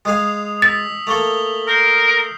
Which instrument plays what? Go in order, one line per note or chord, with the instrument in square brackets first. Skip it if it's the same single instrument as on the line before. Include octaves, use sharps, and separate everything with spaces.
[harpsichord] G#3 G#4 F5 [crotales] D#6 F7
[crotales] D#6 E6 B6 [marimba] A6
[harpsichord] A3 A#3 A4 [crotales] F7 G7
[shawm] A#4 [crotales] F6 G6 C7